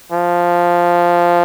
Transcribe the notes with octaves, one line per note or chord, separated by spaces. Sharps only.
F3